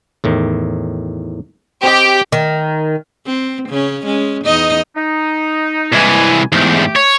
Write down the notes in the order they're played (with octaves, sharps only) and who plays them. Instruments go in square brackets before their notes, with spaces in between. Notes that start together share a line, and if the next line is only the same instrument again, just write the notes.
[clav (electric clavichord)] E2 A2 D#3
[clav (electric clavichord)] C4 D#5 [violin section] G4 G5
[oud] D#3
[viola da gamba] C4
C#3 C#4
G#3 C#4
E2 D#4 D#5
[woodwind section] D#4
[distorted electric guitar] C2 E3 [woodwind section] G#3 G#5
[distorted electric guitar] E2 G#2 [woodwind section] A3 G4
[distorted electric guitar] C#5